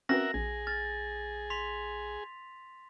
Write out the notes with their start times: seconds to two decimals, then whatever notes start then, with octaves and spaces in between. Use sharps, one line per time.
0.09 C4 C#4 F#4 A#4 B4 E5 F#5 A#6
0.34 A#1 G#4
0.67 F6 A6
1.50 C6 B6 F7